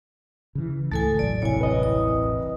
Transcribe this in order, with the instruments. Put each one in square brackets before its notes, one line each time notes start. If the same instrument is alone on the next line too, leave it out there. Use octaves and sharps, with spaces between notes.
[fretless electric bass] C#3 E3
[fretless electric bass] C#2 G#2 E3 [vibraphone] A3 A4 G#5 [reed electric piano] A6
[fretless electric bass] E1 A1 F#3 [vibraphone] D5
[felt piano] C2 [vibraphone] C#5 G#5
[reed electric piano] B4 D#5
[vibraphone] D#6